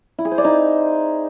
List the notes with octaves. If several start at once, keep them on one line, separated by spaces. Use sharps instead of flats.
E4
G#4
C5
D5
D#4